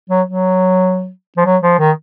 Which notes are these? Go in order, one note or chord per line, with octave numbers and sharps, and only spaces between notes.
F#3
F#3
F3
F#3
F3
D#3